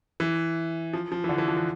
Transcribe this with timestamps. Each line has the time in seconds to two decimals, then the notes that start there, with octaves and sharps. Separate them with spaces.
0.20 E3
0.93 F3
1.12 F3
1.24 E3
1.29 D3
1.38 E3
1.48 F3
1.57 E3